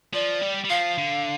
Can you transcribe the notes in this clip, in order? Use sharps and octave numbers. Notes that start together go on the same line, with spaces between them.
F3 D5
G3
G3
F3 F5
D3